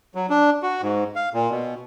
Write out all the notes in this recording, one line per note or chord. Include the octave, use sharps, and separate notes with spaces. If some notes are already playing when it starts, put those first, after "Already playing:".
F#3
D4
F#4
G#2
F5
A#2
B2